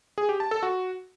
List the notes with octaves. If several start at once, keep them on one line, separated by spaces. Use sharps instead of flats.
G#4
G4
A5
A4
F#4